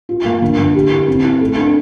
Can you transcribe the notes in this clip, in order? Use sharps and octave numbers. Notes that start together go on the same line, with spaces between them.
F4
A#3
D3
D3
G4
E4
C4
E4
A3
D4